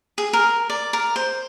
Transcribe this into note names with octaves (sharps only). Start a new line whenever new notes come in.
G#4
A#4
D5
A#4
C5